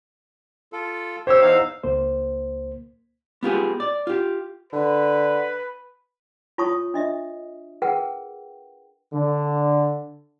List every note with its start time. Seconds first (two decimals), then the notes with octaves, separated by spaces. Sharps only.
0.73 F4 A4
1.27 G4 C5 C#5 E6
1.41 E2 D#4 F5
1.84 C#2 A#3 C5
3.43 B3 F4 G4 G#4
3.80 D5
4.07 F4 G4
4.73 D3 B4
6.58 F4 C#5 A5 C#6 D#6
6.94 D4 D#5 E5
7.82 G#4 A#4 B4 F#5 G5
9.14 D3